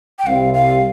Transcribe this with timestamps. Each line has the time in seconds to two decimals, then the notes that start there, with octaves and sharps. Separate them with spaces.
0.19 G5
0.27 C2 C3 G3 C4 F5
0.54 F5